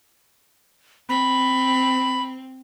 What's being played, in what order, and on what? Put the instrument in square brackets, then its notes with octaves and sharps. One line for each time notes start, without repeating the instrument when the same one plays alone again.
[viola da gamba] C4 [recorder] B5